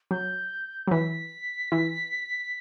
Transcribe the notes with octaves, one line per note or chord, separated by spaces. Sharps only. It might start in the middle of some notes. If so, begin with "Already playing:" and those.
F#3 G6
F#3
E3 B6
E3